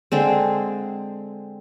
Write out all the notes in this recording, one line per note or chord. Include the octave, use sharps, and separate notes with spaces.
D3 G#3 C4